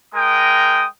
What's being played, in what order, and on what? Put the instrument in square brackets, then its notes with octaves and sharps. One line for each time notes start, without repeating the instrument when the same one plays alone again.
[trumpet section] G#3 A#4 G5 D#6